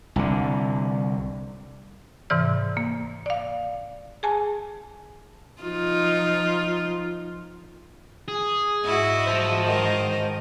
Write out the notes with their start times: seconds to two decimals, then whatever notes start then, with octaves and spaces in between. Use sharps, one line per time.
0.16 C2 D3
2.30 G#2 C3 E3 D5 F6
2.77 A#3
3.26 D5 F5
4.23 G#4 G#5 A5
5.62 F3 D#4 F4
8.28 G#4
8.85 G#2 E4 F#4 D#5
9.27 C5 A5
9.64 D#3 A#4